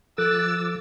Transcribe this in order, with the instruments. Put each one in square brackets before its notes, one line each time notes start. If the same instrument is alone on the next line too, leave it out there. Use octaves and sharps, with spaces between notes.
[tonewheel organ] F3 D6 A6 [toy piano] A4 [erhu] E6 [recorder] F#6